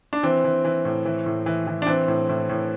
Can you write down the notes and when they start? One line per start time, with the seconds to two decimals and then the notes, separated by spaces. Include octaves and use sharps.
0.13 D4
0.23 E3 C4
0.44 E3
0.65 E3
0.85 A2
1.06 E3
1.26 A2
1.46 E3
1.67 E3
1.82 D4
1.87 E3 C4
2.08 A2
2.29 A2
2.49 A2